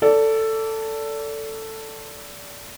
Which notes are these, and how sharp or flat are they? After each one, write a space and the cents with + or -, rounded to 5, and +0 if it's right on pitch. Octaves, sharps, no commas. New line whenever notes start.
A4 +10 D5 -25